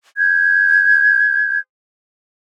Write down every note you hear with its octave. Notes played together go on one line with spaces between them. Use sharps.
G6 G#6